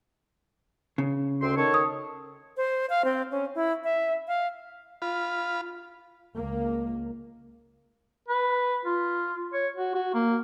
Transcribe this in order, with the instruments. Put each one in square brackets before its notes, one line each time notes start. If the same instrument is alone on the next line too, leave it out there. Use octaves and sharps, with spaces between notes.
[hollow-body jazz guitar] C#3
[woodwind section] D2 C4 C6
D#3 A4 C#5
[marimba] D#6
[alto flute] C5
F5
C4
C#4
E4
E5
F5
[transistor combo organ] F4 B5
[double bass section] C#2 A#3
[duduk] B4
F4
C#5
F#4
F#4
A#3